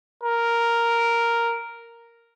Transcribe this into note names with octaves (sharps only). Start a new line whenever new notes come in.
A#4